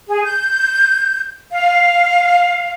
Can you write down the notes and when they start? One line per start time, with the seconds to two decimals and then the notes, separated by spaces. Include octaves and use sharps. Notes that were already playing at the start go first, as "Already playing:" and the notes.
0.08 G#4
0.25 G6
1.52 F5